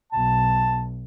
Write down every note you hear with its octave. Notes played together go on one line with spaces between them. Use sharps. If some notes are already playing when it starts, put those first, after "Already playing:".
B1 A5